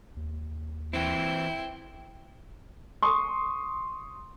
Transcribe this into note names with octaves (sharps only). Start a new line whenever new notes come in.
D#2
E3 C4 E4 G5 C6
C6 C#6 D#6